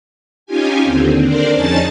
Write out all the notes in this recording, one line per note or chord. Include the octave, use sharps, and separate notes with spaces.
C#4 D#4 F4 G4 G#5
D#2 D3 C4
D4 A#4 C5 D5
F2 C#4 D#4 G#4 A5 A6